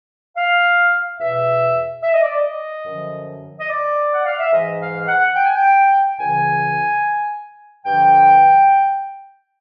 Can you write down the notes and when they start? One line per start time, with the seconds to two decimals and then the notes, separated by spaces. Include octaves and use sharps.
0.36 F5
1.19 E2 B2 E5
2.03 E5
2.14 D#5
2.23 D5
2.34 D#5
2.86 F#2 D3 F3
3.60 D#5
3.69 D5
4.12 F#5
4.25 F5
4.39 E5
4.52 G#2 E3 D#5
4.80 F5
5.07 F#5
5.36 G5
5.45 G#5
5.55 G5
6.19 C#2 C#3 E3 G#5
7.85 G2 D3 F3 G5